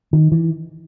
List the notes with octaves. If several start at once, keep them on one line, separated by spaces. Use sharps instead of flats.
D#3
E3